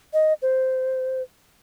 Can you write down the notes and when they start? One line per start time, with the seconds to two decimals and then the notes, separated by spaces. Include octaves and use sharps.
0.13 D#5
0.42 C5